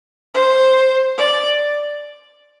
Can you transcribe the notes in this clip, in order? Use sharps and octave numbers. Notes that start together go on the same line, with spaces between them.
C5
D5